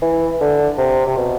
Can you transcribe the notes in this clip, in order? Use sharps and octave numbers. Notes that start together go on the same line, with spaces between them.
E3
D3
C3
C3
B2